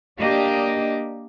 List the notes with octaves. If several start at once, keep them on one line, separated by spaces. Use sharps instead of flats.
A#3 D4 G4 D#5